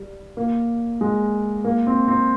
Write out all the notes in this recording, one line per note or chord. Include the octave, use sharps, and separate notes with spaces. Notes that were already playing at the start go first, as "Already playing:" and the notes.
Already playing: G3
A#3
G#3
A#3
C4
C4